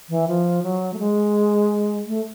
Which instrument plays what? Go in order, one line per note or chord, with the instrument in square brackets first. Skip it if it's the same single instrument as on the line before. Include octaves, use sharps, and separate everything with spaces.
[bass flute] E3
F3
F#3
A3
G#3
A3